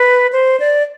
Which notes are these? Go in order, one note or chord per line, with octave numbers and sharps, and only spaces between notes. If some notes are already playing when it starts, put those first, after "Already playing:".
Already playing: B4
C5
D5